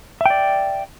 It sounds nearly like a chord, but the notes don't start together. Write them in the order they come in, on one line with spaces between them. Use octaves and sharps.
E5 G5 D5